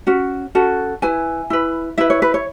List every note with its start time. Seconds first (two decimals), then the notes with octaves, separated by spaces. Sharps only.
0.07 C#4 F#4
0.55 C#4 F#4 A4
1.02 E4 B4 G#5
1.50 E4 B4
1.98 E4 B4 E5
2.10 C#5
2.22 B4
2.34 C#5